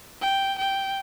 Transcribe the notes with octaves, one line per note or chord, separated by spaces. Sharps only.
G5
G5